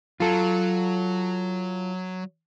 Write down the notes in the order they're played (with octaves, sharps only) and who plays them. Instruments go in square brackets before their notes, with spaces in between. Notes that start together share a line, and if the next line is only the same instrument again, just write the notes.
[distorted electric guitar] F#3 [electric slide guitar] F4 A4